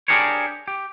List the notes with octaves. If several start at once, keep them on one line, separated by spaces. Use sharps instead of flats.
D4 G4 G#4 A#4 C5 C#5
G4